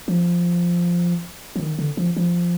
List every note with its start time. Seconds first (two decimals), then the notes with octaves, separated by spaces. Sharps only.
0.08 F3
1.56 F3
1.60 D#3
1.79 D3
1.97 F3
2.16 F3